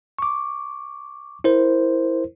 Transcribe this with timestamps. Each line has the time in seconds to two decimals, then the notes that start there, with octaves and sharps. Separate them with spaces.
0.19 C#6 D6
1.44 E4 A#4 C5